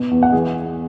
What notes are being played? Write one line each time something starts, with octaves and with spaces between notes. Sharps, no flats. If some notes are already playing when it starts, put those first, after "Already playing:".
Already playing: B2
E2
F#5
E3 G#4